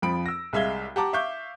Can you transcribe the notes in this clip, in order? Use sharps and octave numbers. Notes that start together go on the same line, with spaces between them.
F2 F3 B5 D7
E6 A#6
C2 G#3 E5 F5 G#6 G7
G4 F#5 A5 A#5 D6
E5 F5 C#6 D6 G6